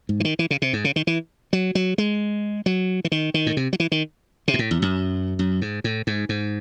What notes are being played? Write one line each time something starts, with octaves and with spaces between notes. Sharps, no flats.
G#2
E3
D#3
E3
C#3
C3
G#2
C#3
D#3
E3
F#3
F#3
G#3
F#3
E3
D#3
D#3
A2
C3
F#3
E3
D#3
C3
G#2
A2
E2
F#2
F#2
G#2
A2
G#2
G#2